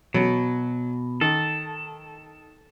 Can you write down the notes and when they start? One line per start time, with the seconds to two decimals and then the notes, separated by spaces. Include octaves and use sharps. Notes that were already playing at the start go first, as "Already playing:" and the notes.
0.14 B2 F#3
1.21 D#3 A4